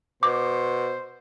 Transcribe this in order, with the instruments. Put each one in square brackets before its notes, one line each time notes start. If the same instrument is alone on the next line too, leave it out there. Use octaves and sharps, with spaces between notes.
[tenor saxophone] B2 [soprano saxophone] C5 [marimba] D6